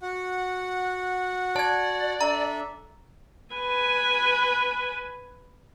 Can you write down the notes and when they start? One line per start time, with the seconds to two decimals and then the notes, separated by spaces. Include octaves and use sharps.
0.02 F#4 F#5
1.56 D5 A5 G#6
2.21 D4 A4 E5 A#5
3.55 B4 G#5